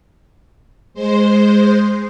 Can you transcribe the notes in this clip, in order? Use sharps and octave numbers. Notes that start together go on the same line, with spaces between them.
G#3 C5